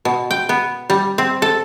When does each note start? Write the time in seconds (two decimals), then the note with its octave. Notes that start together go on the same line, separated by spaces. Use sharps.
0.05 B2
0.31 G5
0.49 B3
0.90 G3
1.18 C4
1.42 A4